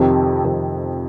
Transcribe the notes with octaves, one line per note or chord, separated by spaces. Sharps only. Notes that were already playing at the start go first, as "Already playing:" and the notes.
Already playing: F2 C3 D#3
F2 C3 D#3